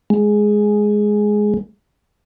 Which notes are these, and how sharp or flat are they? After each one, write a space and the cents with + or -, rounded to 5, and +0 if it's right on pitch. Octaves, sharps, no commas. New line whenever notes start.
G#3 +5